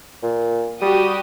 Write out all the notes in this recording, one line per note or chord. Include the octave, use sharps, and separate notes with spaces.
A#2
G3 F#4 G4 D#6